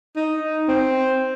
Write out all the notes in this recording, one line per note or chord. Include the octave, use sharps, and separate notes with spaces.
D#4
C4